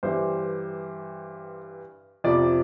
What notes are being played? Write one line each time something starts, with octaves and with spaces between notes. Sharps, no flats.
G2 E3 G3 C5
F2 C3 F3 D5